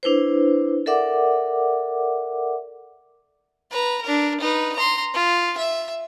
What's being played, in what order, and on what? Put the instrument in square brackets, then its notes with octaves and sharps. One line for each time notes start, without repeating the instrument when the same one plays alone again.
[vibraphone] D4 E4 B4 C5
A4 A#4 D5 E5 F#5 D6
[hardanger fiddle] B4 A#5
D4 A#4
D#4 B4
A#5 C6
F4
E5